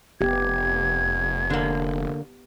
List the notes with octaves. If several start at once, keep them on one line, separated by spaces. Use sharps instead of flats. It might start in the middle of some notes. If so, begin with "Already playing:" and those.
F1 B3 G4 G#6
D3 A#3